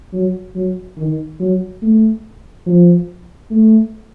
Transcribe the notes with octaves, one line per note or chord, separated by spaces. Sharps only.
F#3
F#3
D#3
F#3
A3
F3
A3